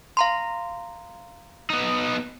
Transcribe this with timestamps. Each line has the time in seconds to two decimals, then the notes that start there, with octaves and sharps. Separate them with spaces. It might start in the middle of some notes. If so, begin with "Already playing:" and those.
0.17 F5 A#5 C6
1.70 B3 D#4